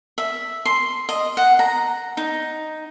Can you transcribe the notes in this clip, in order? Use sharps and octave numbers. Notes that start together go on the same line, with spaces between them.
E5
C6
D#5
F#5
A#5
D#4